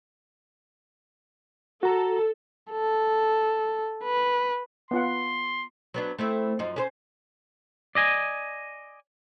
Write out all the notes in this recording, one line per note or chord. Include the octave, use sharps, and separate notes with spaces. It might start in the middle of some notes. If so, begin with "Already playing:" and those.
F#4 A4 A#5
A4
B4
B3 F4 F#5 C6
F#3 B3 D4
A3 C4 E4
F#2 F3 D#4
C#4 G#4 C5
D5 D#5 G#5